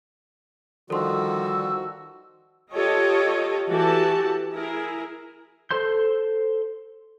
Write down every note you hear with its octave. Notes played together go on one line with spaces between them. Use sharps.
D3 D#3 F3 G3 F#4 A4 C6 E6
F4 G4 A4 C#5 D#5
E3 F#4 G4 A4 A5
E4 G#4 A#4
A4 C5 C6 G6